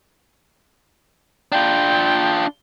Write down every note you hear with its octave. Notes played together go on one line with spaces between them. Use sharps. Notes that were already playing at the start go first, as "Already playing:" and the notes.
D4 F4 G5